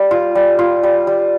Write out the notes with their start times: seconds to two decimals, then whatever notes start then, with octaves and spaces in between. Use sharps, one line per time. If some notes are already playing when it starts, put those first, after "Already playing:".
Already playing: G3
0.11 F4
0.35 G3
0.59 F4
0.83 G3
1.07 G3